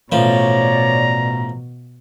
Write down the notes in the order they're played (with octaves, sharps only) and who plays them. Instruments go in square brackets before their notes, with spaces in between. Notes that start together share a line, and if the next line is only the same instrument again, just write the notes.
[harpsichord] A1 F3 [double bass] B2 [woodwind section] C#5 D5 [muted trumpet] A#5